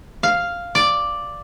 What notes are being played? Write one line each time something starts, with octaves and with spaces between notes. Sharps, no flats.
F5
D5